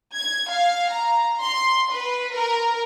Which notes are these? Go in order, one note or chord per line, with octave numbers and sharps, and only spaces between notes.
G#6
F5
A#5
C6
B4
A#4